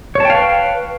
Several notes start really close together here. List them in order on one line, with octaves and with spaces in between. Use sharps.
C#5 A5 G5 F5 B4